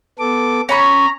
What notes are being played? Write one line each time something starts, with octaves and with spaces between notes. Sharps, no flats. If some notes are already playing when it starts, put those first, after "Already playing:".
B3 A4 D6
C#4 A#5 B5 C#6